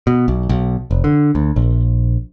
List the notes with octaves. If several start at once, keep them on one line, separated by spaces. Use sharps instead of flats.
B2
B1
B1
F1
D3
D2
A#1